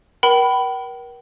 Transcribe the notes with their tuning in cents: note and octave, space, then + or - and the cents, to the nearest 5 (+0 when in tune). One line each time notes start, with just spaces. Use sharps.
A#4 +35 G5 -40 B5 +5